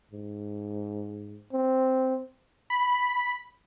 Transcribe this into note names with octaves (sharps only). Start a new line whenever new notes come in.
G#2
C4
B5